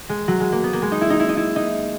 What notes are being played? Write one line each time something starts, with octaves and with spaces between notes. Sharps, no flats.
G#3
F#3
G#3
A#3
B3
A#3
G#3
D#4
E4
D#4
E4
D#4
E4
D#4